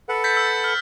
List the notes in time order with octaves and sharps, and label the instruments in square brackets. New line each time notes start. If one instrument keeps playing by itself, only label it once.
[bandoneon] A4 B4 F#5
[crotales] G6 A6 B6
E6
F6